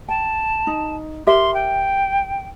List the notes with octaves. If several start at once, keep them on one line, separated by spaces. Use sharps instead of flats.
G5 A5
D#4
G4 A#4 E5 C6
G5